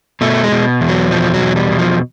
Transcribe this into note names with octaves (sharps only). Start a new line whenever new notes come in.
B2 A3
G#3
B2
E2
F#3
B2 F3
F#3
E2
G3
B2
F3